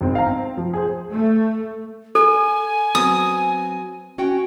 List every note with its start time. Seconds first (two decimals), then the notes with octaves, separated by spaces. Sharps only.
0.01 G#1 C4
0.15 F5 A#5
0.27 C4
0.57 F3
0.74 G#4 C5
1.11 A3
2.15 A4 G#5
2.95 F#3 B3 C4 D#6
4.18 C#4 F#4 G5